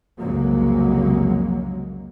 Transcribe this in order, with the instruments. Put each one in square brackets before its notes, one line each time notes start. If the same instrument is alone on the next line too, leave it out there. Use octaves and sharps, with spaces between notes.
[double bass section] C2 F2 C#3 F#3 G#3 A#3